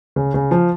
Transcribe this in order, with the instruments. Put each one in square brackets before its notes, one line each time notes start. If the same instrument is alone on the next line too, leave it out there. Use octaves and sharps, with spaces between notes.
[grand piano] C#3
C#3
F3